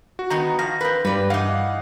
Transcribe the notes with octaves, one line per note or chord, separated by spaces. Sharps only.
F#4
D#3 B3 D#4 A#5
F3 F5 A#6
C4 B4
G2 G3 B4 D5
E3 D#4 F5 F#5